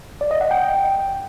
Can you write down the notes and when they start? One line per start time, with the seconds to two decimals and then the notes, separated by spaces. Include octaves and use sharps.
0.21 D5
0.31 D#5
0.41 F#5
0.51 G5